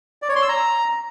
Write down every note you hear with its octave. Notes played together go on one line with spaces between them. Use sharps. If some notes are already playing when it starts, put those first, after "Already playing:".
D5
C#5
C6
E6
A#5